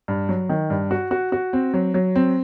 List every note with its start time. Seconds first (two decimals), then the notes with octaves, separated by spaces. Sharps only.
0.08 G2
0.29 F#3
0.49 D#3
0.70 G2
0.91 F#4
1.11 F#4
1.32 F#4
1.53 C4
1.74 F#3
1.94 F#3
2.16 C4